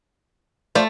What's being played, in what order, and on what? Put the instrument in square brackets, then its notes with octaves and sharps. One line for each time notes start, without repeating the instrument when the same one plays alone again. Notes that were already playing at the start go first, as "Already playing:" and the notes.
[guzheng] A3 [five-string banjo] F4 C5 D5